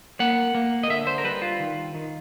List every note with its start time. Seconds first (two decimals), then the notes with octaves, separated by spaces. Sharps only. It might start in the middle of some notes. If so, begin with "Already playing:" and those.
0.20 A#3 F#5
0.55 A#3
0.83 D#5
0.89 D3 E5
1.07 C5
1.18 A#4
1.24 G3 B4
1.42 F4
1.60 D#3
1.95 D#3